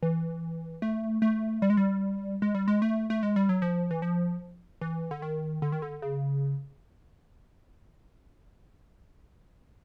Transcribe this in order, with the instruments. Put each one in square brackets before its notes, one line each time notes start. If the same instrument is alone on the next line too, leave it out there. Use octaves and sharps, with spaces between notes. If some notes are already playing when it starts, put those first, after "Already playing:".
[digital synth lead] E3
A3
A3
G3
G#3
G3
G#3
G3
G#3
A3
A3
G#3
G3
F#3
F3
E3
F3
E3
D3
D#3
D3
D#3
D3
C#3